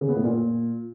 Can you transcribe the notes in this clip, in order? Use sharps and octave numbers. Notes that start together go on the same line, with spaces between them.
C#3
B3
A2
A#2